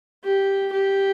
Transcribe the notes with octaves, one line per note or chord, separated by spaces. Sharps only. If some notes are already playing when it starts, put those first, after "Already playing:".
G4
G4